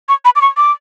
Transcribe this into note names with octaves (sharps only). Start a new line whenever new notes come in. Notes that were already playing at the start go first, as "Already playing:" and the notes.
C#6
B5
D6
C#6
D6